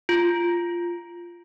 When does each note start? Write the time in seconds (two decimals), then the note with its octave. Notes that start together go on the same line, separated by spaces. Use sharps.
0.09 F4